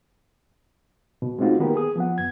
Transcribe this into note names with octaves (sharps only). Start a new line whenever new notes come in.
B2
G#3 A3 C4 D#4 F4 F#4
D#3 A#3 B3 G4 A#4
G#4 D#6
F3 B3 F#5
F#2 G#6